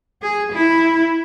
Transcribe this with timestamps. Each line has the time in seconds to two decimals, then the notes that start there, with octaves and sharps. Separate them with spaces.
0.22 G#4
0.53 E4